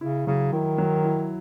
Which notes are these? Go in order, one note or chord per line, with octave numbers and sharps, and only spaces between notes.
C#3 E4
C#3 F#3
D#3 E4
F#3
E4